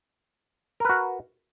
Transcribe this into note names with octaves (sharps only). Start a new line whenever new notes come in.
F#4 A#4 B4